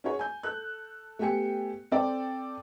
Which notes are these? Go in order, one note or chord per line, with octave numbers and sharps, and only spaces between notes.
C#4 F#4 G#4 C#5
G#5 G6
A4 F#6
A3 B3 G4 G5 G#5 C#7
C4 A4 D5 G5